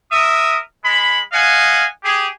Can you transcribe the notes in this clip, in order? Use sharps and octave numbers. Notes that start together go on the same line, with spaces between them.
A#4 E5 D#6
G#3 B5
D#5 F5 F#5 G#5
G4 G#4